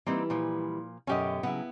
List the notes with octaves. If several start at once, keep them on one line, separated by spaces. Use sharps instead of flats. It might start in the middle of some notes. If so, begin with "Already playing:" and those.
E3 G3 A#3 C4 D#4
A#2 F3
F#2 B2 D3 C#4 G4 D#5
C#3 F#3 B3 E4